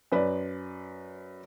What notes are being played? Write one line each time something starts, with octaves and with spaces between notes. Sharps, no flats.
F#2 B4 D5